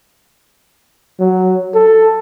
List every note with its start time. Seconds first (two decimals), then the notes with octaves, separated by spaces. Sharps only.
1.19 F#3
1.74 A4